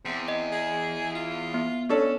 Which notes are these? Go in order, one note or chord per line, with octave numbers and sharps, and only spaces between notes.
E2 C4
D#5
G#4
F4
B3
C#4 D4 A4